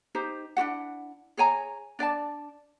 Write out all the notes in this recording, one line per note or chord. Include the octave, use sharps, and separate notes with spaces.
D#4 G4 C5
D4 E4 F#4 F#5
G#4 C#5 G#5 A#5
D4 D5 E5 A5